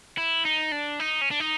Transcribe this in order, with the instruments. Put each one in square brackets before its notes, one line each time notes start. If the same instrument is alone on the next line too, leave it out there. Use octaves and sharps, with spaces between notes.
[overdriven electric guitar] E4
D#4
D4
D#4
C#4
D4
D#4